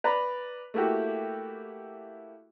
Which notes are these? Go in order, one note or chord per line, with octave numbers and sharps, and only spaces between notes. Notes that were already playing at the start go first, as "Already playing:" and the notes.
B4 D5 A#5 B5
A3 A#3 E4 F#4 G4